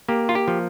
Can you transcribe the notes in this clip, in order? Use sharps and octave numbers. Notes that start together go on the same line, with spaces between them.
A#3 G4
F4
G4
F3